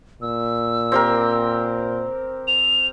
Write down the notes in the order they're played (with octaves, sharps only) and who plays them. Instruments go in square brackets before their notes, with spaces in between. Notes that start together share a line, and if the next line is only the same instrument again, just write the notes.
[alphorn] A#2 [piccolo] E6
[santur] C4 G4 A#4
[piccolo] F7